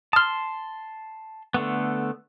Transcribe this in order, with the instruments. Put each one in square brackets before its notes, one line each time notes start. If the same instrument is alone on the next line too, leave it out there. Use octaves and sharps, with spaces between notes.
[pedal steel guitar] A5 C6 [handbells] D#6 F6
[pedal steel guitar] D3 A3 B3